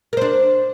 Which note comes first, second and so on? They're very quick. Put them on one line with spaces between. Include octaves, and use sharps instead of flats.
A#4 C5 D4